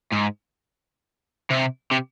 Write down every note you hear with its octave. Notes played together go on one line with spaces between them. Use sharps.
G#2
C3
C3